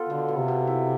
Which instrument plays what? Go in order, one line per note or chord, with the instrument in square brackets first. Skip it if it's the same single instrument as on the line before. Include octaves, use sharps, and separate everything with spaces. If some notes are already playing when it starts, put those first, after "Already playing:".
Already playing: [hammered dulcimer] B3 F4 A4
[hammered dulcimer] B2 [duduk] D3
[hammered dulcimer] B2
[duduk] C3
[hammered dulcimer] B2
E4